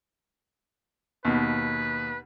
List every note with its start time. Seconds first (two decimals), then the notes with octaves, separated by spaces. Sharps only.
1.25 D#2 B2 B4